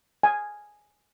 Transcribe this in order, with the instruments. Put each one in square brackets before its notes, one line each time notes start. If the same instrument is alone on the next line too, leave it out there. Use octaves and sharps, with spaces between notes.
[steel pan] G#5